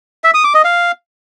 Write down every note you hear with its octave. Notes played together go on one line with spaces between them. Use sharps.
E5
D#6
D6
D#5
F5